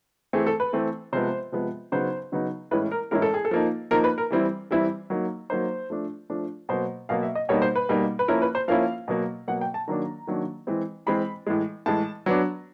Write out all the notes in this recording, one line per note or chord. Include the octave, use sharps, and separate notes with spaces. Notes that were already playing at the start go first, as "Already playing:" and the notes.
E3 A3 C4 G#4
A4
B4
E3 A3 C4
C3 F3 G#3 B3 C5
C3 F3 G#3 B3
C#3 F#3 B3 D#4 C5
C#3 F#3 B3 D#4
A2 E3 G#3 C#4 E4 B4
A#4
A2 E3 G#3 C#4 E4 A#4
A4
G#4
A4
F3 A#3 D#4
F3 A#3 D#4 A#4
B4
A#4
E3 G3 C4 E4
E3 G3 C4 E4
F#3 A#3 D#4
F#3 A#3 D#4 C5
F3 A3 D4
F3 A3 D4
B2 F#3 A#3 C5
B2 F#3 A#3 F5
E5
D#5
B2 G3 A#3 D#4 C#5
C5
B4
B2 G3 A#3 D#4
B4
F3 A#3 C#4 E4 A#4
B4
C5
F3 A#3 C#4 E4 F5
B2 F#3 A#3
B2 F#3 A#3 F#5
G5
A5
D#3 F#3 A#3 D4 A#5
D#3 F#3 A#3 D4
E3 G#3 C4
E3 G#3 C4 B5
A2 E3 G#3
A2 E3 G#3 A5
F#3 B3 D4